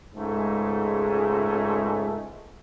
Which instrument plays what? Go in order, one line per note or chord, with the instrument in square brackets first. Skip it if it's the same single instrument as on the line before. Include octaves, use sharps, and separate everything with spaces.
[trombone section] C#2 G#2 G#3 A3